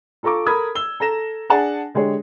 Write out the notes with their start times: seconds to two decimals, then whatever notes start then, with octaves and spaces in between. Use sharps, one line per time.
0.23 F4 A4 A#5 C#6 D6
0.46 A4 A#4 B5 D#6 G#6
0.75 E6 G7
1.00 A4 A#5 A#6 E7
1.49 D4 G#4 F#5 G#5 A5
1.95 D3 G#3 G4 G#4 C#5